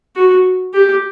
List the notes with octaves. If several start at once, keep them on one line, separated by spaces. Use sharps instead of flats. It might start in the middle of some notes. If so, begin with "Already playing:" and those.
F#4
G4